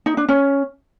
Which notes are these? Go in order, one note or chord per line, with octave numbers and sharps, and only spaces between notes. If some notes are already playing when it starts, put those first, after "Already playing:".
D#4
D4
C#4